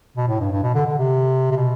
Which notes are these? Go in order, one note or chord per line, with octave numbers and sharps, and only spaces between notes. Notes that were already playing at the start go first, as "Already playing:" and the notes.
B2
A2
G2
G2
B2
D3
D3
C3
C3
B2